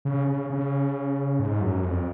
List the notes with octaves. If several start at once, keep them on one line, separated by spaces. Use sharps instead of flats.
C#3
C#3
C#3
G#2
F#2
F2